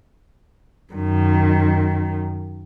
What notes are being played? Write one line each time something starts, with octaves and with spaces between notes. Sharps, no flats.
F#2 D#3